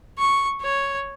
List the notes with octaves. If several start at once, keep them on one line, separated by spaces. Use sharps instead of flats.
C#6
C#5